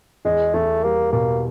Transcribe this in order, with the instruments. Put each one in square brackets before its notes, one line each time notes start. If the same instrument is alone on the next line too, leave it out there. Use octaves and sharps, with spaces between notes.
[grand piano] E2 [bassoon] G#3
[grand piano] E2 [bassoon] A3
[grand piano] G3 [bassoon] A#3
[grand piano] B2 [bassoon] A#3